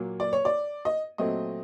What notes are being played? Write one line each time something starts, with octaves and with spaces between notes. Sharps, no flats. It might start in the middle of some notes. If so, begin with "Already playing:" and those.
Already playing: A#2 F#3 A#3
D5
C#5
D5
D#5
A#2 F#3 A3 C4 D#5